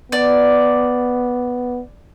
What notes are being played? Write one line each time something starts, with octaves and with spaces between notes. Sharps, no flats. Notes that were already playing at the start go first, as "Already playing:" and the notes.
B3 D5